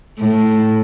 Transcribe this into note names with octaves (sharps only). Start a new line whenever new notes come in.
A2